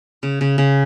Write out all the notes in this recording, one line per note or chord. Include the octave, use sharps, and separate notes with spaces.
C#3
C#3
C#3